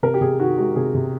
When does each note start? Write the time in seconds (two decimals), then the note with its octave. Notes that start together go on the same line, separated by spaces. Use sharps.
0.03 C3 A#4
0.14 G4
0.21 C3 G#4
0.40 D#3 F#4
0.58 G#3 F#4
0.76 C3 G#4
0.94 C3